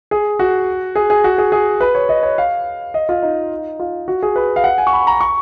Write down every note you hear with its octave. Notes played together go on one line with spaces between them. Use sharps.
G#4
F#4
G#4
G#4
F#4
G#4
G#4
B4
C#5
D#5
C#5
F5
D#5
F4
D#4
F4
F#4
G#4
B4
F5
F#5
G#5
C#6
B5
A#5
C#6